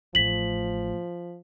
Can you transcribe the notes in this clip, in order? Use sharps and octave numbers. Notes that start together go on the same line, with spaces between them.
A1 F3 A3 B6 F#7